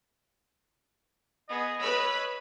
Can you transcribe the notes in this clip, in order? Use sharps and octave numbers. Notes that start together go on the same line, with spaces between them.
B3 G#4 D#5
B4 C#5 B5 E6